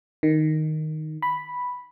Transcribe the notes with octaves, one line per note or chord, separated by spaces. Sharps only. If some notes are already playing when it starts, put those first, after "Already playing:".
D#3
B5